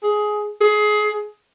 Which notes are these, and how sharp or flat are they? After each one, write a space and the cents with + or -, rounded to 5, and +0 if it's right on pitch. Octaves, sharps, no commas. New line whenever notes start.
G#4 +15
G#4 +25